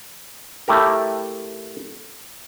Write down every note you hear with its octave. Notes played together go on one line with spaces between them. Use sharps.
A3 E4 G4 A#4